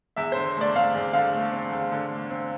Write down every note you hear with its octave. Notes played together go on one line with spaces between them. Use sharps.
E2 E5
D3 C5
A3 D5
C4 F5
E2
D3 F5
A3
C4
E2
D3
A3
C4